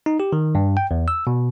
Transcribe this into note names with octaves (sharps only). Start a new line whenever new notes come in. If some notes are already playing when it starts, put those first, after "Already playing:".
D#4
G4
D#3
G2
G5
E2
E6
B2